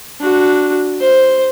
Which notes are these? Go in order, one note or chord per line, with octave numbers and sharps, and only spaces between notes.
D4 F#4
C5